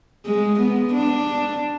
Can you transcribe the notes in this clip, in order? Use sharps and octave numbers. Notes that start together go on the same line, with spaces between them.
G#3
B3
D4